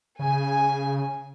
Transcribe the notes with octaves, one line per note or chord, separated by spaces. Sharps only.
C#3 G#5